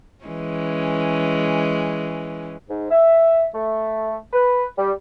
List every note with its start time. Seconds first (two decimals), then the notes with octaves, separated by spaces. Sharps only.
0.25 E3 G#3 C#4
2.69 G#2
2.91 E5
3.54 A3
4.33 B4
4.78 G3